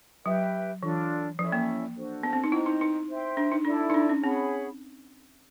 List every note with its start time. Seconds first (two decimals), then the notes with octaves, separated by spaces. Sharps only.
0.25 F#3 G4 B4 E5 G5
0.83 E3 D4 F4 A4
1.38 F3 C#4 E4 A4 D5
1.52 A#3
1.96 D4 F#4 A4 C5
2.23 B3
2.33 C4
2.44 D#4
2.52 E4 C5 D#5 G5 A#5
2.66 D#4
2.81 D#4
3.09 C5 E5 G5 C6
3.37 D4
3.52 D#4
3.65 D4 E4 A4 D5
3.90 D#4
3.94 D4
4.09 C#4
4.23 C4 G#4 C#5 F#5 B5